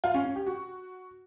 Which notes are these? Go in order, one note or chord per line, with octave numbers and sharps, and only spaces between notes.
F4
C#4
C#4
G4
F#4